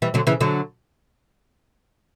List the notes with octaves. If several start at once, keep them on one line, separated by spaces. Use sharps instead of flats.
E3 G3
D3 F#3
C#3 E3
D3 F#3